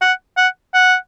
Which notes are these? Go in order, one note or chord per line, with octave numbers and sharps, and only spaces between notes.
F#5
F#5
F#5